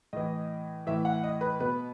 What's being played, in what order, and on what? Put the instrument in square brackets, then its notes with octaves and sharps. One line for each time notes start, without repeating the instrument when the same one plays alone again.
[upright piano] A2 E3 D#5
A2 E3 E5
F#5
D#5
B4
B2 B4